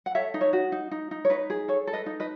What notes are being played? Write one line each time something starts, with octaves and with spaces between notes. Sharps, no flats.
F#5
A4 C#5 E5
D#4
C#5 E5
F#4
D#4
D#4
D#4
C#5
D#4 B4
G#4
A4 C#5
A4
B4 D#5
D#4
B4 D#5